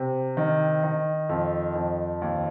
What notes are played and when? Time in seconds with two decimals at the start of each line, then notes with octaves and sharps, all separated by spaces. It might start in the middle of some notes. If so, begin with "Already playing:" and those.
Already playing: C3
0.37 D#3
0.83 D#3
1.29 F2
1.75 F2
2.22 D#2